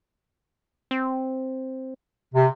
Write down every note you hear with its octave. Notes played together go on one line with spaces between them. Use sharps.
C4
C3